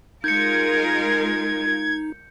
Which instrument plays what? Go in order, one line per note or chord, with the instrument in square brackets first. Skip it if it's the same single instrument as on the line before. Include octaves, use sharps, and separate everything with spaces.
[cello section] G#3 F4 A#4 [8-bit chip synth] D#4 [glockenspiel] G6 C#7 [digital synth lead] G#6